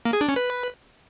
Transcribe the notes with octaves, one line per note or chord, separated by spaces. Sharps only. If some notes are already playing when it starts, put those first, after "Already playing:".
A#3
G#4
D4
C#4
B4